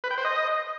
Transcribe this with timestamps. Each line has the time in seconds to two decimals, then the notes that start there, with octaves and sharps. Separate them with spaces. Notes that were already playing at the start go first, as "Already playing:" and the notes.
0.04 B4
0.11 G5
0.18 C5
0.25 D#5